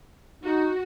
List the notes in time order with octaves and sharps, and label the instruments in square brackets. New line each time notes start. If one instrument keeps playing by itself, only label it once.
[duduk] D#4 [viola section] F#4